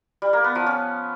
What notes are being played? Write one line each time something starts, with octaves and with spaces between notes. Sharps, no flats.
G3
A#3
B3
F3
C#4